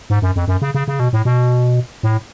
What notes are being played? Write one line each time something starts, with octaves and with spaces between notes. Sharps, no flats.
G#2
F#2
F2
F#2
C#3
C#3
C#3
B2
A2
B2
A2